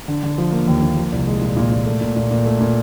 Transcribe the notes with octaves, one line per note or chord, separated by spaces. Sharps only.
D3
D3
F3
A#3
D#2
A#3
F3
C2
G#3
A#2
A#2
A#2
A3
A#2
A#2
A#2
A3
A#2